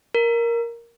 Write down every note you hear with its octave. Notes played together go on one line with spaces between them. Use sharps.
A#4